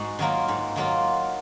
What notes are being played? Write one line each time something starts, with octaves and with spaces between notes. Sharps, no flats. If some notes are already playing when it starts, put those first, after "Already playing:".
Already playing: G#2 G#3 D#4 F#4
D#3 F#3 A#3 F4
G#2
D#3 F#3 A#3 F4